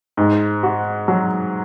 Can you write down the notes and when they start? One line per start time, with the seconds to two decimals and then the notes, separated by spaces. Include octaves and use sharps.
0.17 G#2
0.63 F#4
1.08 F#3